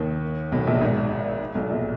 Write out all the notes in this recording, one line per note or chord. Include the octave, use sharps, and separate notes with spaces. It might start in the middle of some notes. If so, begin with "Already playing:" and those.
Already playing: D#2 D#3
B1 B2
A#1 A#2
G#1 G#2
B1 B2
A#1 A#2